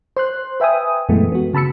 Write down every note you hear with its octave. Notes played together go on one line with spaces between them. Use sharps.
C5 C6 F#6
B4 E5 G5 G#5 D#6
F#2 A#2 E3 G#3 A3 B3
B3 F#4
C#3 A5 B5 E6 C#7